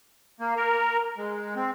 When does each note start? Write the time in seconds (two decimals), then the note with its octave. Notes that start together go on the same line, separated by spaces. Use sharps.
0.40 A#3
0.56 A#4
1.18 G#3
1.56 C4